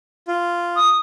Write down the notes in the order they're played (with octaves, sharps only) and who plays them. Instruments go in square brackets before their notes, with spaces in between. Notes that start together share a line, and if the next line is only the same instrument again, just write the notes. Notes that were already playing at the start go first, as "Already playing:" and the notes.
[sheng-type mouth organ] F4
[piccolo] D#6